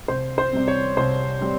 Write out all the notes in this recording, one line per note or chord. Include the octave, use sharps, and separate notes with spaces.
C2 C5
C5
C3 G3 C4
C#5
C2 C5
C3 G3 C4